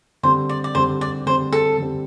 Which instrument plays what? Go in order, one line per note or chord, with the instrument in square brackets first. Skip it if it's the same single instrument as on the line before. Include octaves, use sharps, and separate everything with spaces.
[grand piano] D3 G3 C4 [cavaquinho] C5
[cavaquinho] D5
D5
[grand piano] D3 G3 C4 [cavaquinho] C5
[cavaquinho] D5
[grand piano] D3 G3 C4 [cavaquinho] C5
[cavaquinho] A4
[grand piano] D3 G3 C4